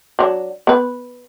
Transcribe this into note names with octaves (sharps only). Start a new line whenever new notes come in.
F#3 D4
B3 B4